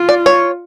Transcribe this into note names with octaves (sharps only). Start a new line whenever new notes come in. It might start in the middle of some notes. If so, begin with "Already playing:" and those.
Already playing: F4
D5
C#5